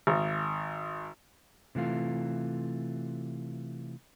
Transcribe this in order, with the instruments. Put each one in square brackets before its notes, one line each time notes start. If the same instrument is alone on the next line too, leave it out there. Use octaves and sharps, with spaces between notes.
[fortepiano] G#1
[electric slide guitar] C3 E3 A3 F4